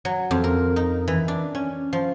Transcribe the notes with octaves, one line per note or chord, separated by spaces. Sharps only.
F#3
F2
A#4
D#4
E3
D4
C#4
F3